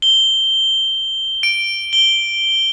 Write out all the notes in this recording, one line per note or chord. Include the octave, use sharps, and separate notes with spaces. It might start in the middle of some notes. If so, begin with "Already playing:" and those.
G7
D7
G7